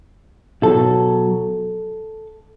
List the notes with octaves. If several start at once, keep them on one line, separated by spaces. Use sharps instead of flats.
B2 F#3 A4